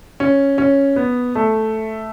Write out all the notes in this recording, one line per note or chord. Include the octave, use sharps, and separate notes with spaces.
C#4
C#4
B3
A3